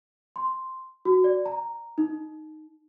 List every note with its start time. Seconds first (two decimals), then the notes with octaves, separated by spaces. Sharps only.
0.36 C6
1.05 F#4
1.24 D5
1.46 A#5
1.98 D#4